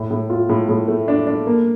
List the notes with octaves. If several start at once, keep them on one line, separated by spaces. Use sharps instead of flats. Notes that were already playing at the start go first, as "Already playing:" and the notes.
Already playing: A2
A2
F4
A2
A2
A3
D4
D4
A#3